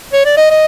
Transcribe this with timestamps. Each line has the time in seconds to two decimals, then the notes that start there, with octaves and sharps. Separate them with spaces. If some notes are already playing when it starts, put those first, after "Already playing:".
0.13 C#5
0.26 D5
0.37 D#5
0.51 D#5